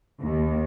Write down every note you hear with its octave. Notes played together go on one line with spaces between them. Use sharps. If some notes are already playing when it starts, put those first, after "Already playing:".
D#2